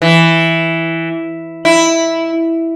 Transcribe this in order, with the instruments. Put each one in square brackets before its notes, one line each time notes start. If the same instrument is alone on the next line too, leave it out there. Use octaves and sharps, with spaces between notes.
[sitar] E3
E4